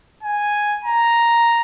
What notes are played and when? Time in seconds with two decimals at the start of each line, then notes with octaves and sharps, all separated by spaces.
0.23 G#5
0.84 A#5